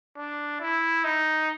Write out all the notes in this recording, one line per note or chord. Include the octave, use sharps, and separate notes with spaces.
D4
E4
D#4